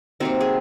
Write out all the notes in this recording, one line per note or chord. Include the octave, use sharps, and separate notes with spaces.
C3 F#3 A#3 C4 D#4
G#4